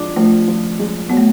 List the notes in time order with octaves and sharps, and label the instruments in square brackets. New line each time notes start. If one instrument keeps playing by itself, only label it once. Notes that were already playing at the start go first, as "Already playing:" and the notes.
Already playing: [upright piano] F3 G#3 D4
[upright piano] F3 [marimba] A3
[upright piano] F3
G#3
[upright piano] F#3 [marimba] B3
[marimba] A3